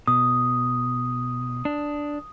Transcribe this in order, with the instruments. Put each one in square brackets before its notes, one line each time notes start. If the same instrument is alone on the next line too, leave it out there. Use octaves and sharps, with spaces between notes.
[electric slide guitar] B2 [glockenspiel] D#6
[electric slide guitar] D4